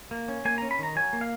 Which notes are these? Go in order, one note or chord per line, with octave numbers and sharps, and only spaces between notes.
A#3
C#4
A#3 G#5
C#4 A#5
B5
D#3 A#5
F#3 G#5
A#3
F5